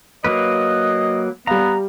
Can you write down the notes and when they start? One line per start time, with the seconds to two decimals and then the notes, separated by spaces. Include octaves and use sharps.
0.24 F#3 A#3 B4 D#5
1.47 G3 B3 F5 A#5